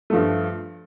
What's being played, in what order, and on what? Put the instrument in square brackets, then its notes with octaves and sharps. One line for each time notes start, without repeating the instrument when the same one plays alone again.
[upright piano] G2 F3 A3